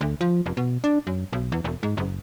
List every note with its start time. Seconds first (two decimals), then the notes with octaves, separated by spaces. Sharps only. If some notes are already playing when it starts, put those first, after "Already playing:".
0.01 D2
0.21 F3
0.46 F1
0.57 B2
0.84 D4
1.07 F#2
1.33 B1
1.52 E2
1.64 E1
1.83 G#2
1.97 F#1